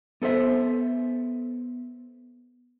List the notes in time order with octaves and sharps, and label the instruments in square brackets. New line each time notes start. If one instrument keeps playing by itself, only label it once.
[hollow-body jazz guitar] B3 A4 C5 E5